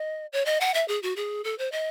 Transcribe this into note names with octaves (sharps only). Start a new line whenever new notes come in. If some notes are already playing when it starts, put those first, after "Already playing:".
Already playing: D#5
C#5
D#5
F#5
E5
G#4
F#4
G#4
A4
C5
D#5